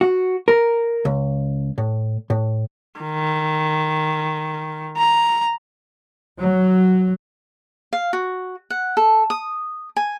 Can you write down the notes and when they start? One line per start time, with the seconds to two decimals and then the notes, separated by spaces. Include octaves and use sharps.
0.01 F#4
0.48 A#4
1.05 C#2
1.78 A2
2.30 A2
3.01 D#3
4.97 A#5
6.39 F#3
7.93 F5
8.13 F#4
8.70 F#5
8.97 A4
9.30 D#6
9.96 G#5